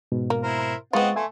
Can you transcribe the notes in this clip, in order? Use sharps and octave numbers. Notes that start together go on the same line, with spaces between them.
G#2 B2
A#3
E4 A#4 C5
G#3 B3 C4 F4 D#5 F#5 C#6 A6
A3 E5 G#5 C6